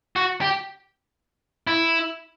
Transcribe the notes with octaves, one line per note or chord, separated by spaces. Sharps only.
F#4
G4
E4